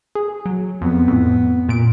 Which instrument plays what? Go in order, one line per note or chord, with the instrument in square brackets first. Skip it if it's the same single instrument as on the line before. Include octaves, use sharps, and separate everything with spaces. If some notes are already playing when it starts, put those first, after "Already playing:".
[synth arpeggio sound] G#4
F#3
[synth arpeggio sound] F2 [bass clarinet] B3
[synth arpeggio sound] F2 A2
A#2 D7